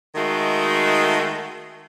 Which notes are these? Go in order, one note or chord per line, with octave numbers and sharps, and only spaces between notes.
D#3 G#3 A3 F#4